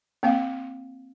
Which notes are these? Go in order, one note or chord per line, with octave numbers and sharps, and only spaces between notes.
A#3 C4 F5